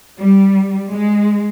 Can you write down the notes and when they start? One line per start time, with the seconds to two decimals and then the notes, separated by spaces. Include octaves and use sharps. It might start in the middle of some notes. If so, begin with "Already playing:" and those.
0.19 G3
0.91 G#3